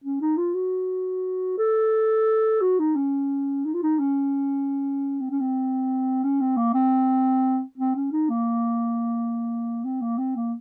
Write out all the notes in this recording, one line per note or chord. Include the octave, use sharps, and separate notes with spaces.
C#4
D#4
F4
F#4
A4
F#4
D#4
C#4
D#4
F4
D#4
C#4
C4
C#4
C4
C#4
C4
A#3
C4
C4
C#4
D#4
A#3
C4
A#3
C4
A#3